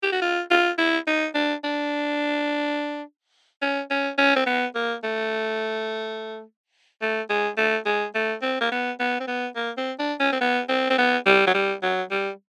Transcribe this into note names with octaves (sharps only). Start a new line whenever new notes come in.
G4
F#4
F4
F4
E4
D#4
D4
D4
C#4
C#4
C#4
C4
B3
A#3
A3
A3
G#3
A3
G#3
A3
C4
A#3
B3
B3
C4
B3
A#3
C4
D4
C#4
C4
B3
C4
C4
B3
G3
F#3
G3
F#3
G3